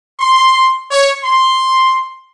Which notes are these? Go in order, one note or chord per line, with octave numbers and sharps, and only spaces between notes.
C6
C#5
C6